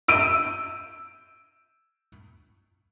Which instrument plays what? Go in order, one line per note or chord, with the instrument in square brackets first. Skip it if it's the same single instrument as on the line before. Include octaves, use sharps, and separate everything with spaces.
[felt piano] E6 D7 D#7